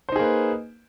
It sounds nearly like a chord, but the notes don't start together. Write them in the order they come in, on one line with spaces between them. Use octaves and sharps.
C5 D#4 G#4 A#3 B4